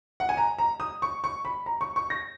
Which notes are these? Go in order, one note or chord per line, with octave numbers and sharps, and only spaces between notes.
F#5
G#5
A#5
A#5
D#6
C#6
C#6
B5
A#5
C#6
C#6
A#6